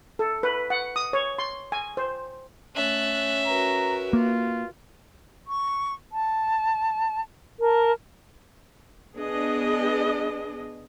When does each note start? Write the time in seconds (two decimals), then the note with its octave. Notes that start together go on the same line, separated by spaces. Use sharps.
0.19 A4
0.43 B4
0.70 F#5
0.96 D#6
1.13 C#5
1.39 C6
1.72 G#5
1.97 C5
2.75 A3 C#4 E5 F#6 A6
3.46 F#4 A#4 B4 A#5
4.13 A#3 F4
5.45 C#6
6.11 A5
7.60 A#4 A5
9.16 B3 D4 G#4 D#5